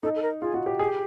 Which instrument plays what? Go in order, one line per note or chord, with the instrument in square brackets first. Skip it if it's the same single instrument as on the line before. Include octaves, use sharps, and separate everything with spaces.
[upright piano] D#4 [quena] A4
[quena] A4
A#4
[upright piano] F4 [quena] G#4
[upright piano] F#4
G4
[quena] G4 [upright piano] G#4